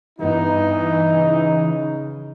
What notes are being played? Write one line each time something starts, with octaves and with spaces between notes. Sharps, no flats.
G2 E3 B3 D#4
C#3